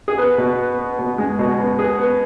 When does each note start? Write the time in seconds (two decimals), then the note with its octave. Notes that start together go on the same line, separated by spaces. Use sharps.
0.08 G#4
0.18 B3 B4
0.38 B2
0.58 B3
0.78 B3
0.99 B2
1.18 G#3
1.39 B2
1.59 B2
1.78 B3 G#4
1.99 B3